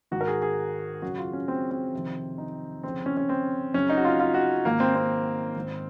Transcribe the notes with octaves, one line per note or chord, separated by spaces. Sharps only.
G#2 D#3 F#4
A#4
G#4
G#4
F#2 C#3 F#4
F4
C#4
C4
C4
F2 C3 D#3
D#4
F2 C#3 C4
C#4
C#4
C4
F#2 C#3 C#4
D#4
F#4
F4
F4
F#4
G#2 D#3 A#3
C4
C4
G#2 D#3